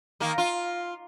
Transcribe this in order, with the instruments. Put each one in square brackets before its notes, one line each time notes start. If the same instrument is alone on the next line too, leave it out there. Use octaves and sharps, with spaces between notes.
[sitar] D#3 A#3
F4